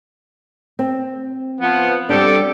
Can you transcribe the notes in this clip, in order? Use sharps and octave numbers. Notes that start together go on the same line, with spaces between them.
C4
F3 B3
G3 C4 D4 G4 A4